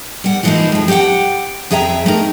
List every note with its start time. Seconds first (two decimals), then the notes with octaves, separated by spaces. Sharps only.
0.24 G3 F#5
0.43 E3 F3 G#3 A#3 D#4 E4
0.72 F2 F3
0.88 G4 G#4 C#5 F#5 G5
1.71 F2 G#4 E5 G5 A#5
2.06 A3 D#4 A#4